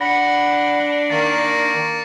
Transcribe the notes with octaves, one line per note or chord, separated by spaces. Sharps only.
D4 F#5 B5 A#6 C#7
D#3 A#3 A6